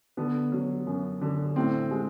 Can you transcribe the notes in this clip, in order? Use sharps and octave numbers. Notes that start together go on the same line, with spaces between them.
D3 B3
F#3
F#2
D3
A2 C4
G#3